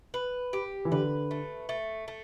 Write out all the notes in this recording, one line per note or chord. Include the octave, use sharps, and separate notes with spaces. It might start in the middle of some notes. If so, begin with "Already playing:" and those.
B4
G4
E3
D3 B4
A3
A3
A3